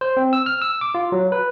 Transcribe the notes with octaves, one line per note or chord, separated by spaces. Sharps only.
C5
C4
E6
F6
E6
D6
F4
F#3
B4